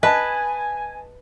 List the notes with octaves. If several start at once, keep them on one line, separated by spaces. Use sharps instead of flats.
B4 D#5 G#5 A5